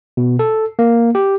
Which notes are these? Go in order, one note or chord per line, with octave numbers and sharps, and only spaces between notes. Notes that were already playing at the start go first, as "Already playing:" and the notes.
B2
A4
A#3
G4